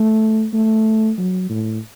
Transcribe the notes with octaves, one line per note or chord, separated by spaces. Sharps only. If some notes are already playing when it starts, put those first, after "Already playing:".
Already playing: A3
A3
F#3
A2